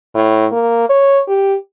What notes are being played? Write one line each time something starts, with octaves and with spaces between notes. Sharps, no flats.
A2
A#3
C#5
G4